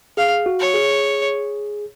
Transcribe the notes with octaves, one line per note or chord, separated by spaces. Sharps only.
G#4 F5
F#4
C#5
G#4